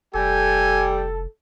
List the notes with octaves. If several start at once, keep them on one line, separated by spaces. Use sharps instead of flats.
F1 G3 G4 A4 G5 G#5